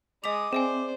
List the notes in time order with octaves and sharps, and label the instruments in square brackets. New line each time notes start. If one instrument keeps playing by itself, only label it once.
[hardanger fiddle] G#3 D#6 [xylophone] D#5 B6 F7 [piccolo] D6
[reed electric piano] C4 [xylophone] G#4 E5 G#5 [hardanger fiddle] C5 D5